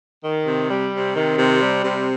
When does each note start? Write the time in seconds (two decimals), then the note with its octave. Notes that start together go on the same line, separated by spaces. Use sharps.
0.23 D#3
0.47 C3
0.70 G3
0.93 C3
1.15 D#3
1.38 C3
1.62 G3
1.84 C3